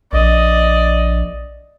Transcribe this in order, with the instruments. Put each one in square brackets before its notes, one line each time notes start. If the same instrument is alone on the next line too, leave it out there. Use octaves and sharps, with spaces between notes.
[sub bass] A#1 [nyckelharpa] D5 D#5